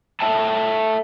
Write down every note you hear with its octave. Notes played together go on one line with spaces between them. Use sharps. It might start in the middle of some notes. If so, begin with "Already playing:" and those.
A4 C#5 E5 G5 A5